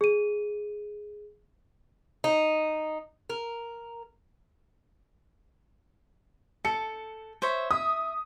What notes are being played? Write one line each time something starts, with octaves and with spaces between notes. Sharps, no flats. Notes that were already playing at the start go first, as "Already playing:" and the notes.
G#4 D#7
D#4
A#4
A4 C#7
C5 C#5 E5
E5 D#6